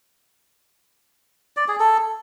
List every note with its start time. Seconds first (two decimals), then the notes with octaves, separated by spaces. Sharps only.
1.57 D5
1.68 G#4
1.80 A4